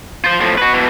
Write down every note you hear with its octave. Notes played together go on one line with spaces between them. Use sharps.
F4 C5
A2 F3
F#4 B4
B2 E3